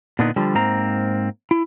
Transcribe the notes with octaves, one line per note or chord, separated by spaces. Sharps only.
A#2 D3 B3 D4 D#4
D3 F3 G3
G#2 A#3 C4 A#5
E4